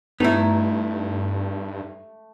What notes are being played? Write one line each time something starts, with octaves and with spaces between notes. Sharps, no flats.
G2 A3 B3 D#4 E4